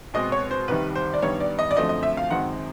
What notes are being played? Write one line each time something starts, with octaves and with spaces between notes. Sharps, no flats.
B2 G#3 C4 D#5
C#5
C5
C2 C3 D#3 G3 B4
C5
D5
G2 D#3 G3 B3 C#5
D5
D#5
D5
F#2 D3 F3 A3 C4 D#5
D#5
E5
F5
F#2 D#3 G#3 C4 F#5